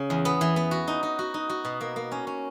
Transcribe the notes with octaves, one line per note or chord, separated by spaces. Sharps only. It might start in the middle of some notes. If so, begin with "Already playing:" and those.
Already playing: C#3
E2
B3
E3
B3
F#4
D#4
D#4
F#4
D#4
F#4
B2
A#3
A#3
C#4
C#4